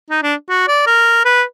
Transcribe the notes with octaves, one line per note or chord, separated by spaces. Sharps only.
D#4
D4
F#4
D5
A#4
B4